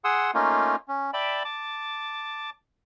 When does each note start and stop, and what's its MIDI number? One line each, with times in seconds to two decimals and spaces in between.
0.04 0.31 68
0.04 0.31 78
0.04 0.31 84
0.04 0.31 87
0.04 0.31 88
0.34 0.76 57
0.34 0.76 58
0.34 0.76 61
0.34 0.76 63
0.34 0.76 65
0.88 1.11 61
1.14 1.43 74
1.14 1.43 76
1.14 1.43 79
1.14 1.43 81
1.14 1.43 83
1.45 2.50 81
1.45 2.50 86